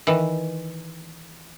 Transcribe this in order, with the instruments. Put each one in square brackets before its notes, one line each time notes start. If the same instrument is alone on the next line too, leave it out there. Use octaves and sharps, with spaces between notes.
[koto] D#3 E3